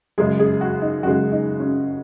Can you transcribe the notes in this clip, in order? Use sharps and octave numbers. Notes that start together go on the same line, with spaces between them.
F#2 C#3 G#3 G#4
G#4
F#4
D#4
F#2 C#3 G#3 F#4
D#4
C#4